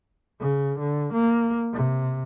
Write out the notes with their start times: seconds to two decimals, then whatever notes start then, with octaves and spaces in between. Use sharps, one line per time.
0.40 C#3
0.79 D3
1.13 A#3
1.73 C3